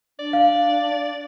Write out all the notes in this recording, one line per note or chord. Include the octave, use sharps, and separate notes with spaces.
D4 D5
F5